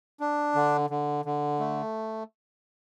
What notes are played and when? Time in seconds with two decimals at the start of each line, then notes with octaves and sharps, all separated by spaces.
0.20 D4
0.55 D3
0.90 D3
1.25 D3
1.60 A3